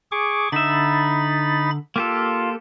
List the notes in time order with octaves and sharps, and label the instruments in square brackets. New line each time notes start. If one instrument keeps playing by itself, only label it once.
[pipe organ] G#4 C#6 D6
[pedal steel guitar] D3 E5 [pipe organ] D#4 B5 A6
[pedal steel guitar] A#3 G4 A4 [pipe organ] F4